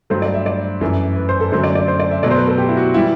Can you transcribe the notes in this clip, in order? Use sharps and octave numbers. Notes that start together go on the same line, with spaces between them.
G2 F#3 A3 C5
D5
E5
D5
F#2 E3 A3
B4
C5
A4
F#2 D3 F#3 A3 C5
D5
D5
C5
D5
E5
B2 F#3 A3 D5
C5
B4
A4
G4
E4
F#4
E3 G3 E4